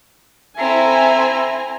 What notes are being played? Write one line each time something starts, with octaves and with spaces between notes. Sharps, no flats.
C4 E4 A4 E5 G#5 A#5